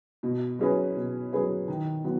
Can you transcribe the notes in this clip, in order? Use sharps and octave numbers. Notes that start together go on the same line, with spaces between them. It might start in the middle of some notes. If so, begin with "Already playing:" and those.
B2
F#3 C#4 G#4 B4
B2
F#3 C#4 G#4 B4
D#3
F#3 B3